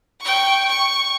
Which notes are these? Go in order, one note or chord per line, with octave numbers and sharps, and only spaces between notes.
G5 C#6
C#6